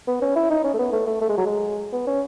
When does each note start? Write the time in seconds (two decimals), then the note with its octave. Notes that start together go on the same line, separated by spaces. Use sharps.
0.07 B3
0.22 C#4
0.36 E4
0.50 D#4
0.64 C#4
0.74 A3
0.78 B3
0.92 A3
1.07 A3
1.21 A3
1.29 G#3
1.37 F#3
1.46 G#3
1.92 B3
2.07 C#4